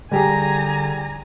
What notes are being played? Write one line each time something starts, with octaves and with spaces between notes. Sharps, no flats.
D3 G3 G4 G#4 G#5 A#5